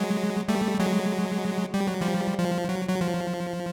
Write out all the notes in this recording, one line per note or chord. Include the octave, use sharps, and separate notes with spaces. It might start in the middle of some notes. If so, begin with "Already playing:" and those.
Already playing: F#3 G#3
G3 A3
F#3 G#3
G3
F#3
F3 G3
F3
F#3
F#3
F3